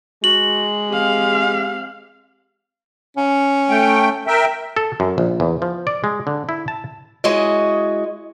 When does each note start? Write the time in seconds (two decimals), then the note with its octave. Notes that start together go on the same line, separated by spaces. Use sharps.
0.24 G#3 F#4 F#7
0.90 C4 G4 F5
3.17 C#4
3.70 A3 G5
4.27 A#4 E5 G5
4.76 A4
5.00 F#2
5.18 A#1
5.40 E2
5.62 F3
5.87 D5
6.04 G#3
6.27 D3
6.49 E4
6.68 A5
7.24 G#3 E4 F#4 C#5 D#5